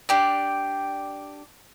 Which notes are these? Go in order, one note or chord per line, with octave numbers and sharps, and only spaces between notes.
D4 G4 D5